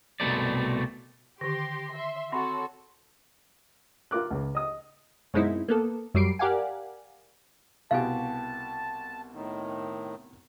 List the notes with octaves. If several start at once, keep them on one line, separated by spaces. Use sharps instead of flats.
C2 B2 A3 C4 D5
D3 D#3 G4 C6 A#6
E5 C6
C4 F#4 A4 C#5 B5 C6
F4 A#4 D6 F#6
C#2
D#5 D#6
F#2 B2 G#3 C4 D#4 E4
A#3 B3 A4
F#2 F#3 G3 C7 D7
G4 A#4 D5 F5 F#5 G#5
C2 B2 G4 F5 G#5 A5
A2 D#3